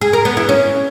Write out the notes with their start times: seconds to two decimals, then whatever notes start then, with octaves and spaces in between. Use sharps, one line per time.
0.01 G#4
0.13 A#4
0.25 B3
0.37 E4
0.49 C#4